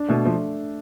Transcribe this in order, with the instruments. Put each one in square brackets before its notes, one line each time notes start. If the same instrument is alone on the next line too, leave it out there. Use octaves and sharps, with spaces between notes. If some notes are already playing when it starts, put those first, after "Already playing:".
Already playing: [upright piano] D4
[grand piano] B2 [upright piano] A3
[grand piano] F3 [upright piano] A3